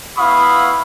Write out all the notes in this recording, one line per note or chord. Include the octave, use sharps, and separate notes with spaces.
B3 E4 F5 B5 C#6 D#6